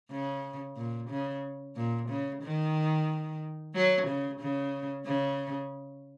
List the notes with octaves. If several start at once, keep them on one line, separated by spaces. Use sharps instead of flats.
C#3
A#2
C#3
A#2
C#3
D#3
F#3
C#3
C#3
C#3